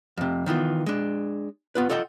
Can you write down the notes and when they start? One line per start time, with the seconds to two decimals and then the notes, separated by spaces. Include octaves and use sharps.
0.17 F2 C3
0.46 D#3 E3 B3 F4
0.86 G#3 D4
1.75 B3 F4 B4
1.90 F4 A4 D#5 F#5 G5